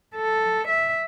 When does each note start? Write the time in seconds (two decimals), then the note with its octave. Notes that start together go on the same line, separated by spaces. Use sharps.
0.16 A4
0.68 E5